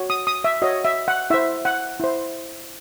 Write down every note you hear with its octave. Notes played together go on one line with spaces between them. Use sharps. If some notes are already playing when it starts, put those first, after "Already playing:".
Already playing: F#4 C#5
D#6
D#6
E5
F#4 C#5 D#5
E5
F#5
E4 C5 E5
F#5
E4 C5